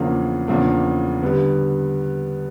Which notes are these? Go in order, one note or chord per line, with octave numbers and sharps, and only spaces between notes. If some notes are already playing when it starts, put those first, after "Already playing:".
Already playing: E2 C#3 F3 A#3 D4
E2 C#3 F3 A#3 D4
D3 G3 B3